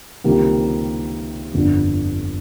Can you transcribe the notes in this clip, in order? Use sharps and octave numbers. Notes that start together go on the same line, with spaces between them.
C#2 C3 D#3 G3 A#3
G1 F2 D3